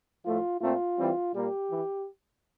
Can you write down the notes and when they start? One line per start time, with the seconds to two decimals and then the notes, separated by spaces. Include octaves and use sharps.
0.24 A2 F3 A3 F4
0.60 A#2 A3 C4 F4
0.96 E3 G3 C4
1.32 A#2 G3 A#3 G4
1.68 E3